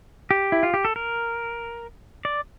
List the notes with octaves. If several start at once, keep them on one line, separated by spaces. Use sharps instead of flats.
G4
E4
F4
G4
A4
A#4
D5